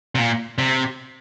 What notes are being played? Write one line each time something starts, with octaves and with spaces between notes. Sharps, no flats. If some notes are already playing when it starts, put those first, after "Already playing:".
C3
A#2
C3